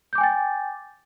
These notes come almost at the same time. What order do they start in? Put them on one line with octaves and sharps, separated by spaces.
G6 D6 G#5 G5 A6